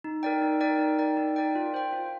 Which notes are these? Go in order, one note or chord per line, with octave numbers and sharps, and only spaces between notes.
D#4
A#4 D5 G5
D#4
A#4 D5 G5
D#4
A#4 D5 G5
D#4
A#4 D5 G5
F4
C5 G5
F4